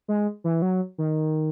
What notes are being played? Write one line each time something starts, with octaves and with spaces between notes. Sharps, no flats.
G#3
E3
F#3
D#3